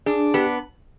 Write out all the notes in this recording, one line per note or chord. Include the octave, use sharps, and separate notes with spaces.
D4 G#4
B3 G4